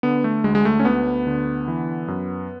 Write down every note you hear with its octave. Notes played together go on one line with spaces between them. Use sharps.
D3 B3
A3
D2 G#3
G#3
A3
C#4
D2 B3
D3
E3
F#2